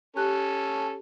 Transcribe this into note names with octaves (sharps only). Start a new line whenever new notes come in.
C#4 G4 A4 F#6